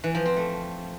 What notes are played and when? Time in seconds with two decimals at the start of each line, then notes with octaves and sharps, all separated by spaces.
0.04 E3
0.15 F3
0.26 C4
0.37 A3